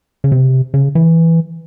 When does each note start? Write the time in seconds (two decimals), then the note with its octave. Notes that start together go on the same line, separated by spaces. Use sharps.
0.24 C#3
0.32 C3
0.74 C#3
0.95 E3